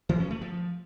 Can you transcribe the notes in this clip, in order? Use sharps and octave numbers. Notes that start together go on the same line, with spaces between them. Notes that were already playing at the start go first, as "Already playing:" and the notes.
E3
C#4
A3
F3